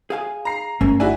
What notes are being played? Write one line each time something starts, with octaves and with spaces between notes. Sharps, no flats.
G#4 F5 G#5
A#5 C7
G1 A3 A#3 C#4
D4 E4 F#4 G#5